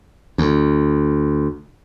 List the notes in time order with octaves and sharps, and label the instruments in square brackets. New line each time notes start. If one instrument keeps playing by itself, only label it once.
[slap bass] D2